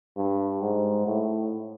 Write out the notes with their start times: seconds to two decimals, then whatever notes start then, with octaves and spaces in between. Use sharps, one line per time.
0.17 G2
0.62 G#2
1.07 A2